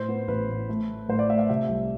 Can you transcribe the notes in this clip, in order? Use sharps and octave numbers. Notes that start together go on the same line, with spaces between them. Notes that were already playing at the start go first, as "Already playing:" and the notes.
Already playing: A2 C5
B3
A1 B4
A2
A3
A2
A2 C5
D5
A3 E5
E5
C3 E5
C2